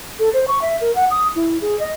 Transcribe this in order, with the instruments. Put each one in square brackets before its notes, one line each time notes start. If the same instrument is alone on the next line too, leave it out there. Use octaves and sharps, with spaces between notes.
[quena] A4
C5
C#6
E5
A#4
F#5
D#6
E4
G#4
D#5